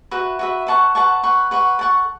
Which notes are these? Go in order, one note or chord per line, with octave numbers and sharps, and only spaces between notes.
F#4 B4 E5
F#4 B4 E5
B4 F#5 A5 C#6
B4 F#5 A5 C#6
B4 F#5 C#6
B4 F#5 C#6
A4 F#5 C#6